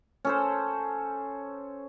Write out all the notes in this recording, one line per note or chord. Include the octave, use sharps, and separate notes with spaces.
C#4 A4 C5